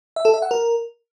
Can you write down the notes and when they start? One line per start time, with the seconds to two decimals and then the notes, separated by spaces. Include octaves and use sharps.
0.16 E5
0.25 A4
0.34 E5
0.42 F#5
0.51 A#4